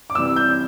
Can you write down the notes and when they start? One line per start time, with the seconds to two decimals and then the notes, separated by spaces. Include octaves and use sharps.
0.10 D6
0.15 C3 E3 G3 E6
0.36 G6